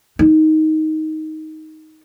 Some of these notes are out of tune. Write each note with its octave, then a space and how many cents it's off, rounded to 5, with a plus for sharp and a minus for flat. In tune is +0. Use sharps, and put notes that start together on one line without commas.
D#4 +10